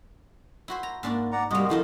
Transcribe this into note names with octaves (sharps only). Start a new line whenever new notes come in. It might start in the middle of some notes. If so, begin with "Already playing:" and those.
E4 F#4 C5
A#5
G#2 A#3 D4 F#4
D5 F#5 A#5
C3 G3 G#3 A#3 F#4 D#6
D#3 F3 D#4 E4 A4